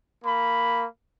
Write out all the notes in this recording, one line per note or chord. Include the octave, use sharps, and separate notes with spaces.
A#3 B5